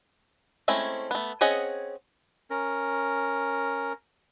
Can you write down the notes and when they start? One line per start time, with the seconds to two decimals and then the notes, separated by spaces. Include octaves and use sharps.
0.68 G#3 A3 C4 C#4 E4
1.11 A3 B3
1.41 C4 C#4 G#4 D#5 F#5
2.50 C#4 A#4